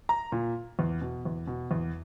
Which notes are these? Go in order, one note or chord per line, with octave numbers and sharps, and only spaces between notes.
A#5
A#2
E2
B2
E2
B2
E2